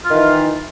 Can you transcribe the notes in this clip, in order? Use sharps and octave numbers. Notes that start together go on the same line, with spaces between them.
D#3 E3 F4